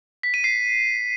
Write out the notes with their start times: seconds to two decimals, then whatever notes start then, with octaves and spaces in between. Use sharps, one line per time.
0.23 B6
0.34 D#7
0.44 C7